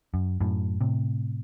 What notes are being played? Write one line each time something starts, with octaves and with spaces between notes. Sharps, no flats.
F#2
F#2 A2
A2 C3